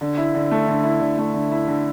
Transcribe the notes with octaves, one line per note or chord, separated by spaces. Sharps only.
D3
E4
D3
A3
D3
E4
D3
A3
D3
E4
D3